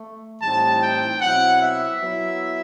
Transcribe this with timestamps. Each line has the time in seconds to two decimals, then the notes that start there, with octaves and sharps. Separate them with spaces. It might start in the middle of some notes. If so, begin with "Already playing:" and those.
Already playing: A3
0.41 A2 E3 G3 C4 D#4 A5
0.81 G5
1.21 B2 F#3 C4 E4 F#5
1.61 E5
2.02 F#3 B3 E4